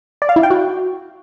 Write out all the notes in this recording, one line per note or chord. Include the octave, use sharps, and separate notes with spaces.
D5
F5
E4
G5
F#4